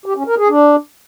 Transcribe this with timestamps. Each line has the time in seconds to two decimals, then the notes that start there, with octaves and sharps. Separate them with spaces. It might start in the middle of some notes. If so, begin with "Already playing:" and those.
0.06 G4
0.16 C#4
0.27 A#4
0.38 G#4
0.49 D4